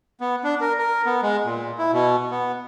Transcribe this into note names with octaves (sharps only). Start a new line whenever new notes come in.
B3
D4
A#4
A#4
B3
G#3
A#2
E4
B2
B3